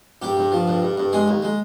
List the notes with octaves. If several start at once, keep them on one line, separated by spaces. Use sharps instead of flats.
G2 G4
G2
F3
G2
G2
G2
G#3 G#4
D#2
G#3